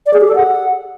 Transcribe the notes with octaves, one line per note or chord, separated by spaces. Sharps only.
D5
G#4
G4
A4
F#5